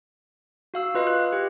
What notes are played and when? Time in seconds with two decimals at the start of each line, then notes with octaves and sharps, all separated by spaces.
0.74 F#4 F5 E6
0.95 F4 B4 D#5 F5
1.07 F#6
1.33 G4